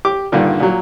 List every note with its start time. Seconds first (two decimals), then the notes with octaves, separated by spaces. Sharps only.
0.05 G4 D6
0.32 G2 A#2 D3 D#3
0.60 A#2 F#3